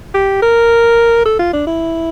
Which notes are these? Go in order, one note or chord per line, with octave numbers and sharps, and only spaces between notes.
G4
A#4
A4
F4
D4
E4